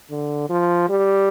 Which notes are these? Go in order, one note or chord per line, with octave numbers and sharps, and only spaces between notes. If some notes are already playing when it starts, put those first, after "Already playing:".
D3
F3
G3